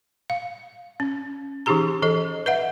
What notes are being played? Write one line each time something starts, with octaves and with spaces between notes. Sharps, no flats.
F5
C#4
E3 C#4 D#4 G4 G#4 A#5
E3 A4 D#5
B4 D#5 E5 F#5